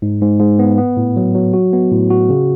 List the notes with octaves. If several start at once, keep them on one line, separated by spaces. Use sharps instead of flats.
G#2
G#2
G#2
B3
B3
A2
F#3
F#3
F#4
B3
A2
F#4
C#3